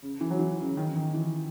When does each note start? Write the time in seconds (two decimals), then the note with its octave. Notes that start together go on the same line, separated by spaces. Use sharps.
0.02 C#3
0.21 E3
0.30 F#3
0.39 E3
0.59 C#3
0.77 D#3
0.96 D#3
1.14 E3